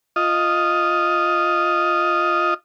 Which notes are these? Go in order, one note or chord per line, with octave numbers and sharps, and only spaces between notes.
F4 D#5